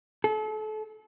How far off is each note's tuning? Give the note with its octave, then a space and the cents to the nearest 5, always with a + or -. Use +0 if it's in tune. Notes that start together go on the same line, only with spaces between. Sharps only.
A4 -35